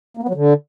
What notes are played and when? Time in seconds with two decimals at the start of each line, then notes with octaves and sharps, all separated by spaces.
0.17 A#3
0.23 B3
0.29 F#3
0.35 D3